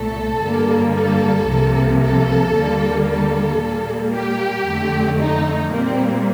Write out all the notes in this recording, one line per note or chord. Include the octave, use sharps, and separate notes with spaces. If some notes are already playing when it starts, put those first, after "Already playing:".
Already playing: C2 A#2 A3 A4
G2 D3 G3 A#3
A4
C2 C3 F3 A#3
A4
D#2 D3 G3 A#3
A4
A#2 G3 A#3
G4
F2 D3 A3
D#4
A#2 G3 A#3 C4